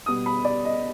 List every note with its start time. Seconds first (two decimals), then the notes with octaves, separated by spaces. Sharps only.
0.06 B2 G3 B3 D#6
0.26 B5
0.45 D5
0.65 D#5